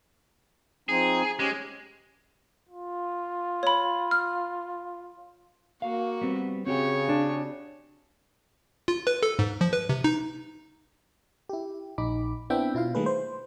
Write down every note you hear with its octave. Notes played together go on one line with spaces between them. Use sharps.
F3 C4 D#4 G#4
G#3 C#4 G4
F4
C#5 B5
F6
A#3 F#4 F5
G3 B3 C4
C#3 C4 F#4 G4 C#5
D4
F4
B4
A4
G#2
F3
B4
C3
D#4
E4 G4
A#1 D#4 B5 D6
B3 C4 D4 E4 E5 G5
B2 E4 F4 F5
D#3 G3 A3 A#3 G#4 B4
C5